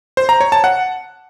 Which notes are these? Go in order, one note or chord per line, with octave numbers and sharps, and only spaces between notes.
C5
A#5
C#5
A5
F#5